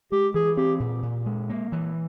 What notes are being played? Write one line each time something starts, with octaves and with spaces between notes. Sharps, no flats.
G#3 G4
E3 G#4
C4 G4
A#2
A#2
G#3
A#3
E3